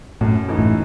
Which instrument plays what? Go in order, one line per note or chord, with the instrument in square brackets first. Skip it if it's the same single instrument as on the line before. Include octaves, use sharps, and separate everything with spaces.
[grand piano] F#2 [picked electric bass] A2
[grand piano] E3 A3 D#4
[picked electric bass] A2